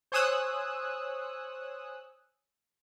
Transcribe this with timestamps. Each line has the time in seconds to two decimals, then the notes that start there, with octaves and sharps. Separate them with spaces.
0.12 C5 C#5 G#5 D#6 E6 F#6